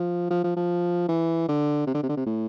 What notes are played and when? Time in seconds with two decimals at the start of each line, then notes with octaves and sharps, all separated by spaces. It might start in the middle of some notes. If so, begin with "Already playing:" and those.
Already playing: F3
0.30 F3
0.44 F3
0.57 F3
1.08 E3
1.49 D3
1.87 C3
1.94 D3
2.03 C3
2.09 D3
2.17 C3
2.26 A2